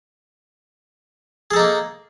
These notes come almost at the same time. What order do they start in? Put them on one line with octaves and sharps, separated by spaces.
G#4 A4 D#4 A#3